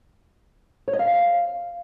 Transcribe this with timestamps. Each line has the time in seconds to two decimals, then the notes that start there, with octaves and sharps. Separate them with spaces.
0.88 C#5
0.93 D#5
0.99 F5